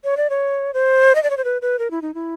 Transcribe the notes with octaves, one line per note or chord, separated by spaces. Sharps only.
C#5
D5
C#5
C5
D#5
D5
C#5
C5
B4
B4
A#4
E4
D#4
E4